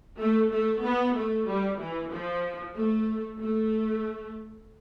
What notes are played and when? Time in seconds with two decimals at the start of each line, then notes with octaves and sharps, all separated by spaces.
0.19 A3
0.52 A3
0.84 B3
1.16 A3
1.48 G3
1.80 E3
2.12 F3
2.76 A3
3.40 A3